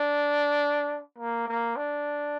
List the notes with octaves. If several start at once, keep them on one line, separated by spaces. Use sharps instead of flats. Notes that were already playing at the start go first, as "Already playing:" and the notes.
Already playing: D4
A#3
A#3
D4